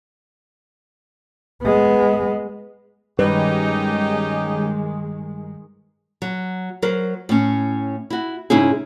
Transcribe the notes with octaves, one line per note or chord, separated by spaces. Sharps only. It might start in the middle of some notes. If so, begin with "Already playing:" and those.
G#3 B3
G2 D#3 G3 G#3 C#4 D#4 G4 B4
F#3
F#3 A#4 C5
A2 C#4
E4 F#4
G#2 C#3 C#4 D#4 E4 G#4